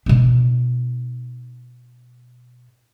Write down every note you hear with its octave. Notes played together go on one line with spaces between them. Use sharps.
B2 D4